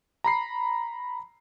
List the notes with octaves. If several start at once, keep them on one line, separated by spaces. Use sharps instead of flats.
A#5 B5 C7